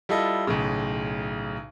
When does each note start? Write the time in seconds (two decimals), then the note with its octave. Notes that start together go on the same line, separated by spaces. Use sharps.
0.09 G3 E4 F4 A4 D#5
0.47 B1 A2 C#3